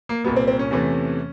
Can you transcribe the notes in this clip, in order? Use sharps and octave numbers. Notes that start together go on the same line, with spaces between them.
A#3
C2 A#2 G3 A#3 B3
C4
C4
C#4
E2 C3 E3 A3